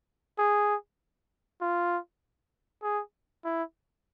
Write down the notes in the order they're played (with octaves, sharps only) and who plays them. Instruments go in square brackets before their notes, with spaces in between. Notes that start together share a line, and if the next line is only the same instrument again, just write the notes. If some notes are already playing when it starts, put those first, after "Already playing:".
[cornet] G#4
F4
G#4
E4